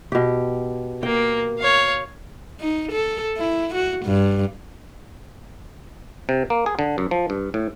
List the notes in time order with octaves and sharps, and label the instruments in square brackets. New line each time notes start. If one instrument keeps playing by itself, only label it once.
[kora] B2 G4
[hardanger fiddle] A#3 [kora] G5
[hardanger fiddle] C#5 F5
[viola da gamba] D#4
A4
E4
F#4
G2
[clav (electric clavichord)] C3
A#3
G#4
D3
F#2
F3
G2
A2